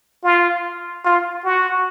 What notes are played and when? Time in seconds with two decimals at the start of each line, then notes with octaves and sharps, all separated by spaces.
0.24 F4
1.05 F4
1.45 F#4